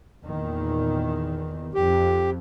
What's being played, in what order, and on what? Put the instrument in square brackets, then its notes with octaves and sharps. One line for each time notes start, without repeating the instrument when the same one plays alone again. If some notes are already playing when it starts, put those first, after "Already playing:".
[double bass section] E2 A#2 D#3
[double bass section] F2 [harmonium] G4